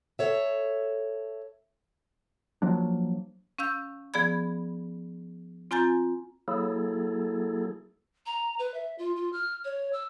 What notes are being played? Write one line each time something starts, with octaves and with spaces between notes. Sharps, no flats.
A4 C#5 E5
F3 F#3 A#3 D4
C#4 F5 E6 G6
F3 B3 G#4 D5 B5 G#6
C4 F4 G#5 A#5 G6 A6
F#3 A#3 E4 G#4 A4
A#5
B4
E5
F4
F4
F6
C#5
E6